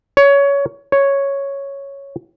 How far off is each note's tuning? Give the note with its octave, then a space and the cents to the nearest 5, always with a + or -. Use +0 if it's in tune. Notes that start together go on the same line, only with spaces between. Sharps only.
C#5 +20
C#5 +0